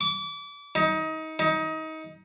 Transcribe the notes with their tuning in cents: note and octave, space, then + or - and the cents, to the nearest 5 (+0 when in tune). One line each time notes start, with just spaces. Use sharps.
D6 -35
D#4 +25
D#4 +25